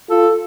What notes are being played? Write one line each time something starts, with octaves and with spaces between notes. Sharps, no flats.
F4 A4